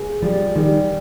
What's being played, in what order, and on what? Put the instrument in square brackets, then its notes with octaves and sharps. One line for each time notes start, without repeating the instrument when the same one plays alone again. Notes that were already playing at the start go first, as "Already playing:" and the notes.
Already playing: [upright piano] G#4
[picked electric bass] F3 [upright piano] G3
[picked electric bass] D#3 [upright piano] G3